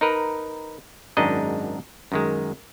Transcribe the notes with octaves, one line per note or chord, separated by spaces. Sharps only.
D#4 A#4 B4
G#1 F#2 G#3 D4 D#4 D#5
F#2 D#3 G#3